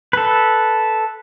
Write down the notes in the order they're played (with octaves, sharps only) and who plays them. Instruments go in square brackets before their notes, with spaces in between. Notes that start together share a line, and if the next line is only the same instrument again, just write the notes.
[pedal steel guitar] A4 B4